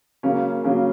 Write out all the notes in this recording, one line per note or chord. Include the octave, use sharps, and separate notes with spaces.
C#3 F#3 A#3 C#4
C#3 F#3 A#3 C#4